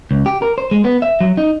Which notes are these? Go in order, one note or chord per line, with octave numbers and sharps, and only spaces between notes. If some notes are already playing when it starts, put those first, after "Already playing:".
C#2
G4
A#4
C5
G#3
B3
E5
F#3
D#4